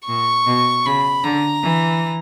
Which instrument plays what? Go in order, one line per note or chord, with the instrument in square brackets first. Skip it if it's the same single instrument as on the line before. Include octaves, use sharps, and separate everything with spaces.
[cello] A#2 [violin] C#6
[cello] B2
[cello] C#3 [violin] B5
[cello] D3 [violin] A#5
[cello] E3